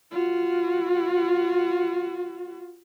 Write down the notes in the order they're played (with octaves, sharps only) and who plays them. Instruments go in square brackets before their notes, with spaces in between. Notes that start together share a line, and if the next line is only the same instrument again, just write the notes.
[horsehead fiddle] F4 F#4